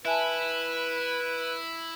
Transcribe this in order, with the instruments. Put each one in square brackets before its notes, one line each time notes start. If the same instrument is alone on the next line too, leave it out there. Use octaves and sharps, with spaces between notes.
[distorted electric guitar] E4 [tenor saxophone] B4 [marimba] E5 G#5 A5